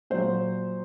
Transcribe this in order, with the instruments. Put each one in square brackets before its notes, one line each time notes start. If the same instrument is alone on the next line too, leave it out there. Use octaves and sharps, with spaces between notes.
[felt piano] A#2 F#3 C5